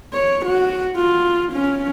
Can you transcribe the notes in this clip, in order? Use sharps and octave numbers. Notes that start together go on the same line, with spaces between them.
C#5
F#4
F4
C#4